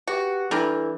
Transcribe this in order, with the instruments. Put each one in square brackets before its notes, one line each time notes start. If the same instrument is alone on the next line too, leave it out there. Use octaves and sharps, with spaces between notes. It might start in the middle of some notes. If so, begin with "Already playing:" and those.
[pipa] F#4 [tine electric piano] G4 B4
[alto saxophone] E3 [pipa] G3 [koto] D4 A#4 [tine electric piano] A4